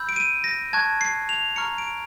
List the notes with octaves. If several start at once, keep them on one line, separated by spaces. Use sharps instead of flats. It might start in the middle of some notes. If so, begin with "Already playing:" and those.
Already playing: B5 E6 G6
D7
D#7
A#6
A5 C#6 F#6 G#6
C7
F7
A#5 C#6 F6 C#7
D7